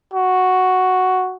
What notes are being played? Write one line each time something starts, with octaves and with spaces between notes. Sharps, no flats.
F#4